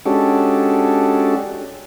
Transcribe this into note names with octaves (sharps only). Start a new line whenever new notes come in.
G#3 C#4 D4 F#4 G4 A4